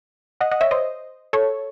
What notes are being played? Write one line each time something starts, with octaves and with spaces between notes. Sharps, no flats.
D#5 F#5
D#5 F#5
C#5 E5
C5 D#5
A4 C#5